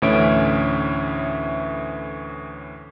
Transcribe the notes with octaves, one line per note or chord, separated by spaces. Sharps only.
D2 A2 E3 C#4 E5 D7